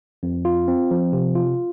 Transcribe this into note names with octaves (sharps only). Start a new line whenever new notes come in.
F2
F4
C4
F3
C3
F4